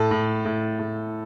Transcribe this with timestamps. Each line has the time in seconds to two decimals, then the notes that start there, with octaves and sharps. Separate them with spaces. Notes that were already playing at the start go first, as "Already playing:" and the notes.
Already playing: A2 A4
0.11 A2
0.45 A2
0.79 A2